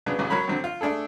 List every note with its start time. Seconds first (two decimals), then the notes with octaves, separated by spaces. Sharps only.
0.06 C#3 F#3 B3 D4
0.19 A1 C#3 F#3
0.30 F#3 A#4 C#5 B5
0.48 D3 F#3 C4
0.64 F4
0.81 A3 D4 G#4 A4